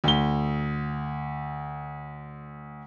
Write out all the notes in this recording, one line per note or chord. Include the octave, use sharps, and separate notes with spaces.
D2 G7